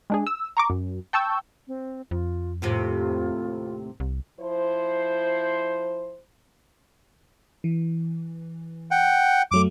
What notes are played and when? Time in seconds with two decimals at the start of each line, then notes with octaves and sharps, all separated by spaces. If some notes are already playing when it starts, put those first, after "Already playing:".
0.10 G#3 D4 G#4
0.27 E6
0.57 A#5 C#6 D6
0.70 F#2
1.13 G5 A5 C#6 E6 G6
1.68 C4
2.11 F2 F4
2.62 D#2 A2 C3 F4
4.00 C2
4.41 F3 E4 C5
7.64 E3
8.91 F#5 G5
9.51 F#2 F#3 A3 D6